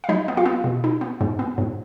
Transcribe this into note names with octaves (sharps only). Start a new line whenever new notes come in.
F5
F#3 D#4 D#5
B3
F4 F5
B3
B2
D#4
B3
G#2
B3
G#2